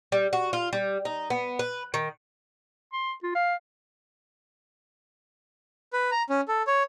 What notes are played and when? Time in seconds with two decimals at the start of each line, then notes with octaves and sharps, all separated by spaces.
0.12 G3
0.33 F#4
0.53 F4
0.73 G3
1.05 D#4
1.30 B3
1.59 B4
1.94 D#3
2.93 C6
3.23 F4
3.35 F5
5.93 B4
6.11 A#5
6.30 C#4
6.48 A4
6.67 C#5